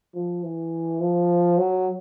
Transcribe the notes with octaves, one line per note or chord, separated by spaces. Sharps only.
F3
E3
F3
F#3